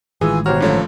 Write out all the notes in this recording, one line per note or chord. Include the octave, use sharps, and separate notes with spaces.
A1 D#3 E3 G#3 F4 G#4 G#5 E6
B1 F#4 G4 C5 C#5 A#5 F6
G2 D3 F3 A3 C#4